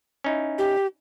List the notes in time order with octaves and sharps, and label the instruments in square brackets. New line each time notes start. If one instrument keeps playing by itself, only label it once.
[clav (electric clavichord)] C#4 D#4 E4
[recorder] G4